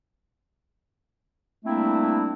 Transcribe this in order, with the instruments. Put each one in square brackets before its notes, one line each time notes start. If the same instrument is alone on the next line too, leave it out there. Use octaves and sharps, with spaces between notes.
[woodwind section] G3 A3 A#3 C4 D4 E4